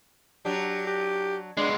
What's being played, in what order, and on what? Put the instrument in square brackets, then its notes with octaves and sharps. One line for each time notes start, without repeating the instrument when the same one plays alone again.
[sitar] F#3 D4 [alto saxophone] G4
[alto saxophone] G4
[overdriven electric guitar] G#3 B3 [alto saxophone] D4